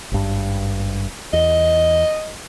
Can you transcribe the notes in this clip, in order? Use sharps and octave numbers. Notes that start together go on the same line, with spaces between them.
G#1 G2
E2 D#5